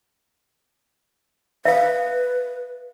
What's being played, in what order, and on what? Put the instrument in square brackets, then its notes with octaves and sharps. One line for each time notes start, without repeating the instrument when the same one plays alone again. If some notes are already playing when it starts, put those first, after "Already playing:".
[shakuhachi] B4 [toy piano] E5 F5